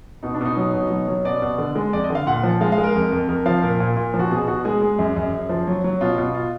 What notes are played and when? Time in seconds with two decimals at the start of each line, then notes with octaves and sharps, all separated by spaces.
0.23 B2 D#4
0.34 D4
0.41 B2 D#4
0.57 F#3
0.74 B2
0.91 F#3
1.08 F#3
1.25 B2 D5
1.42 B2
1.58 D3
1.76 G#3
1.93 F2 D5
2.04 D#5
2.10 D3 F5
2.27 A#2 F#5
2.43 F3
2.61 G#3 F5
2.72 F5
2.78 G#3
2.84 A#4
2.96 F2
3.12 F2
3.29 F2 A#4
3.46 F3 F5
3.63 A#2 A#4
3.80 A#2
3.97 A#2
4.14 F3
4.19 F#4
4.31 B2 G#4
4.48 B2 F#4
4.65 G#3 G#4
4.81 G#3
4.99 F#2
5.16 F#2
5.33 F#2
5.49 F3
5.67 F#3
5.84 F#3
6.01 B2 F4
6.18 B2
6.35 F4